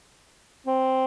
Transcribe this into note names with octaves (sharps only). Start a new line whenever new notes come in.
C4